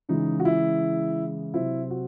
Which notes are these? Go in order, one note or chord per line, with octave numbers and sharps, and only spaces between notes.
C#3 E3 G#3 D#4
F#4
E4
C3 F#3 C4 E4
F#4